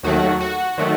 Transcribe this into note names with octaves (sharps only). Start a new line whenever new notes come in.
D#2 D#3 F#3 A3 F#4
F#4
D#3 F#3 A3